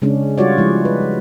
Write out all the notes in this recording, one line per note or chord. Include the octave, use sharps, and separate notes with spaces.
C#3 G#3 C#4 D4
G3 F4 F#4 C#5 D5
F3 G#3 E4
B4